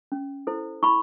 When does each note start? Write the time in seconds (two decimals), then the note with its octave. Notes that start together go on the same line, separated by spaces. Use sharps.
0.12 C#4
0.47 E4 A4 C5
0.83 E4 B5 C#6